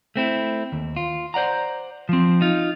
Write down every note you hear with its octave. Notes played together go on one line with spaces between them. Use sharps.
A3 C4 E4
D#2
F4
C5 D5 F#5 A#5
F3 C4
D#4 F4